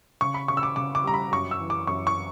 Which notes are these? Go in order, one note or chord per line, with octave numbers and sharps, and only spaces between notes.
C#3 C#6
B5
C#3 C#6
E6
D6
C#3 D6
D6
G3 A#5
B5
F#2 C#6
E6
E3
D6
F#2 C#6
C#6